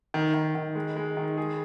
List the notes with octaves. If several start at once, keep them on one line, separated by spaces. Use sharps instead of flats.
D#3
D#3
D#3
G#3
G#3
D#3
G#4